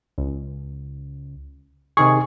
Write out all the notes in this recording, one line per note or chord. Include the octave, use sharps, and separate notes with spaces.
C#2
C3 D#3 G#4 C#6